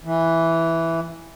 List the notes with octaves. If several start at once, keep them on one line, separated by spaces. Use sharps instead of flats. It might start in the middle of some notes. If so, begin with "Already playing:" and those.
E3